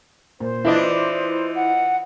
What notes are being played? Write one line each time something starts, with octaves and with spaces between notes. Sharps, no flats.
A#2 C5
E3 D4 E4 F4 B4 D#5
F#5